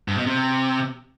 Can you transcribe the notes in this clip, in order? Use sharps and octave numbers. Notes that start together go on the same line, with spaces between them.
G2
B2
C3